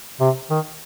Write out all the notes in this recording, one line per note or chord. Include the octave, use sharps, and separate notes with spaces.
C3
D#3